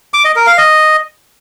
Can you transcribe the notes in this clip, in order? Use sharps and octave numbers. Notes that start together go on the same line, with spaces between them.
D6
D#5
A#4
F5
D#5